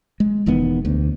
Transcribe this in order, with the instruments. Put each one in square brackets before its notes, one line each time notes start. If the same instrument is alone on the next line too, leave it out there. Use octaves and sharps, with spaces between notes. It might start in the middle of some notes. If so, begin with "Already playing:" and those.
[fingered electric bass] G#3
E1 E2 D#3 B3
D2